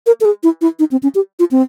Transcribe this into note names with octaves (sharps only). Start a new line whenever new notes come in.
A#4
A4
G#4
E4
E4
D#4
C4
C#4
G4
F4
C4